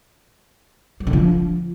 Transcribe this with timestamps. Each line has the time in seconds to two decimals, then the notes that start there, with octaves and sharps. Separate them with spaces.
1.00 F#3
1.07 D3
1.13 F3